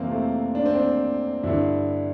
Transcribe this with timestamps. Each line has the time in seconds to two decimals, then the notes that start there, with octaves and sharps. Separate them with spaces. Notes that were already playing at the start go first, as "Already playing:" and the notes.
Already playing: F2 C3 E3 A#3 C4
0.11 A3
0.55 D4
0.66 C4
0.75 D4
1.43 G2 D3 E4